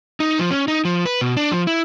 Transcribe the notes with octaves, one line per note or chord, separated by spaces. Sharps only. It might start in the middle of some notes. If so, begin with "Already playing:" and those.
D#4
F3
C#4
D#4
F3
B4
B2
D4
F3
E4